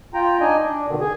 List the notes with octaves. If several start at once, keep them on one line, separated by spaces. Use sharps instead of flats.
F4 G5 A#5
D4 D#4 D#5 G#5
D4
B2 D3 D#3
G#4